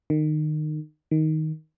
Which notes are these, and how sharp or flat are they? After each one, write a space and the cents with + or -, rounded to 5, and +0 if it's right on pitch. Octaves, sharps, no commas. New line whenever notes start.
D#3 -25
D#3 +10